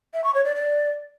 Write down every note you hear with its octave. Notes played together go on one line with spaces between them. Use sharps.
E5
C#6
C#5
D5
D5